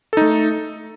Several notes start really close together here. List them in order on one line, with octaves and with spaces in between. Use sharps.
A4 D#4 A3